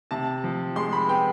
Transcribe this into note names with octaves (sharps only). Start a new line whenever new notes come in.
C3 A5
F3
G#3 C6
B5
B3 G5